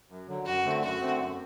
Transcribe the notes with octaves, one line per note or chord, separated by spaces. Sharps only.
F#2
D3 F#3
F#2 F#4
D3 A3 C4
F#2 F#4
D3 A3 C4
F#2